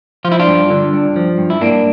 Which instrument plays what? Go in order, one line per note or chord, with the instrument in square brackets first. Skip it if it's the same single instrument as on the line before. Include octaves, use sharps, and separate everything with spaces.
[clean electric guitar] F3 F4
E4
D4 F4
G2
D3
G2
F3
G2
E4
G2 A#3 D4